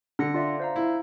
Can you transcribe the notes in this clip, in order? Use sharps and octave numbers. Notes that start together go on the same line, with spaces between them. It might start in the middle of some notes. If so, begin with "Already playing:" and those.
D3 F#5 A#6 C#7
F4 D5 E5
C5 F5 A#5
E4